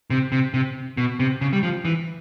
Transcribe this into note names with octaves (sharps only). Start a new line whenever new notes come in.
C3
C3
C3
B2
C3
C#3
G3
F3
E3